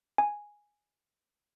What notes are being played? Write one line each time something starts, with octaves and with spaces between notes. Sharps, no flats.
G#5